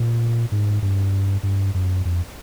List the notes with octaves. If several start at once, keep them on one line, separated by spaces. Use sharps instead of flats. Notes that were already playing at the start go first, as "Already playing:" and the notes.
Already playing: A#2
G#2
G2
G2
F#2
F2